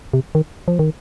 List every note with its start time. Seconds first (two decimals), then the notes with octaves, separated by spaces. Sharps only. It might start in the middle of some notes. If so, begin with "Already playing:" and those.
0.14 C3
0.35 D#3
0.68 F3
0.79 D#3